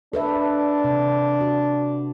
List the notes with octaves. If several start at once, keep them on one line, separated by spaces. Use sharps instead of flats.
D4 A4 B4 E5
C3
F#4